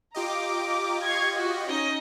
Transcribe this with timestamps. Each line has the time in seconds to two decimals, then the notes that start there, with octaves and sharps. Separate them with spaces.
0.15 F4 G4 D#5 A#5 D6
1.04 F5 C#6 G#6
1.37 F#4
1.67 C#4 D#4 D#5